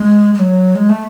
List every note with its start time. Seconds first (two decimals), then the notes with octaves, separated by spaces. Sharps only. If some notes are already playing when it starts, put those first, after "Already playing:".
Already playing: G#3
0.34 G#3
0.39 F#3
0.75 G#3
0.89 A3